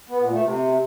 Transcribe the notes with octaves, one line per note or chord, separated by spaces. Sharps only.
B3
A#2
A3
C3